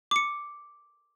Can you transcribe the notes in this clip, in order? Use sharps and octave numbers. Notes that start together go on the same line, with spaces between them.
D6 C#7